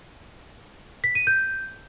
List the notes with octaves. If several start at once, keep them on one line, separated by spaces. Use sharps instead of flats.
B6
D#7
G6